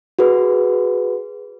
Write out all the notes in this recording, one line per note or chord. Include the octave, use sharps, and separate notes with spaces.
F#4 G#4 B4